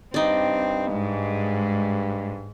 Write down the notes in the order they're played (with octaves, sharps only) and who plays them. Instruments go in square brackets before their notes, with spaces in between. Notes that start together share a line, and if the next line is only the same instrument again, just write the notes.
[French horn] G2 [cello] C4 [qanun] D#4 D5
[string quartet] G#2 [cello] G#3